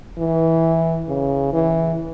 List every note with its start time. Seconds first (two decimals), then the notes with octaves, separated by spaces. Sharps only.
0.18 E3
1.08 C#3
1.53 E3